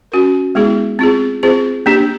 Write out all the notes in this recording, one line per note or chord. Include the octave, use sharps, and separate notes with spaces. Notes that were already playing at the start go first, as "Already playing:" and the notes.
C#4 F#4 A#4
G#3 B3 E4 G#4
C4 F4 G#4
C4 F4 G#4 C5
A#3 D4 G4